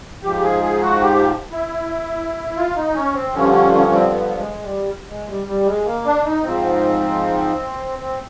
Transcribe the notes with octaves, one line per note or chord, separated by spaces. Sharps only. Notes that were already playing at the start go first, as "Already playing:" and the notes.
G#2 F3 G4
G#4
G#4
F#4
G4
E4
F4
D#4
C#4
C4
G2 D3 F3 C#4
C#4
C#4
C4
B3
G#3
G3
G#3
G3
G3
G#3
A#3
D4
D#4
G#2 F3 C4
C4